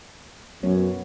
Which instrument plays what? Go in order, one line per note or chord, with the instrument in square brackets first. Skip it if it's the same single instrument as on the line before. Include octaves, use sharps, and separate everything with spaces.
[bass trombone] F#2 [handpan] F#3 B3 C#5